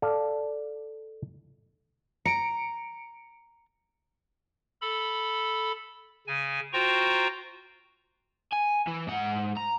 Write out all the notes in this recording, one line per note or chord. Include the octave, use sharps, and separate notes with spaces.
A4 D5 F5
A#5 C#7 D7
A4 B5
C#3 G#5
F4 F#4 C5 G5 A#5 C#6
G#5
E3
G#2 F#5
A#5